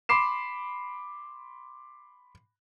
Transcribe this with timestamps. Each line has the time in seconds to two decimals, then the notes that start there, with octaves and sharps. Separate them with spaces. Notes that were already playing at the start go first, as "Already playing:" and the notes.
0.09 B5 C6 D6 C7 E7